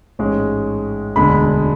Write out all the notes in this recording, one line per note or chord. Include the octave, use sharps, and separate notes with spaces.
A1 G#2 G#3 C#5
E1 D2 D3 G#3 B5